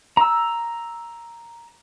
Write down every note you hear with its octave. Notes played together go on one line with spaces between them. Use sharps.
A#5 E6